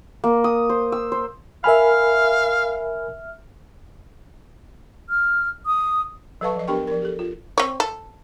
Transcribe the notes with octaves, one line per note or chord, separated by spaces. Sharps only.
A#3
D#6
C5
E6
C5
A#4 E5 F5 G#5 B5 F6
F6
D#6
F#3 A4 B4 F5 A5 C#6
F3 D#5
B3 D4 G4 A#4 G5 C#6
F3 A#4
G4 A4
F4
C4 C#5
A4